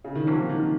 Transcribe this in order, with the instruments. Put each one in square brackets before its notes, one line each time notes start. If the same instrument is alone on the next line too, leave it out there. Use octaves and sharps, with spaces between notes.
[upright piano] C#3
D#3
[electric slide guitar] C3 F#3 A#3 C#4 [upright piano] F3
[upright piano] D#3